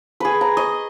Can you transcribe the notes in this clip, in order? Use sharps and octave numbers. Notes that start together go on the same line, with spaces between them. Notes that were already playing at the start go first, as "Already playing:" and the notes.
G#4 B4
A#5
D#5